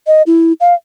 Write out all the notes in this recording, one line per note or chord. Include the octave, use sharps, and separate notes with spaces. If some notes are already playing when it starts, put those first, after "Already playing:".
D#5
E4
F5